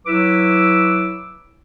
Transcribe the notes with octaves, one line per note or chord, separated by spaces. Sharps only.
F#3 E4 B4 D6 E6